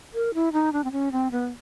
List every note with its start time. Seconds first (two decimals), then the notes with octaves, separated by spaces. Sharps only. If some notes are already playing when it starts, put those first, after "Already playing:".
0.14 A#4
0.34 E4
0.53 D#4
0.73 D4
0.84 C4
0.92 C#4
1.12 C4
1.31 B3